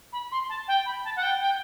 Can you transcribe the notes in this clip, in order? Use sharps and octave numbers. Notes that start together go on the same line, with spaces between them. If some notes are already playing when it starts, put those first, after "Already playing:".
B5
C6
A5
G5
B5
A5
F#5
G5
G5